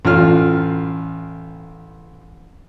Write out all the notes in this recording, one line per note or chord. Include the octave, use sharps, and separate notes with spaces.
A1 F4 F6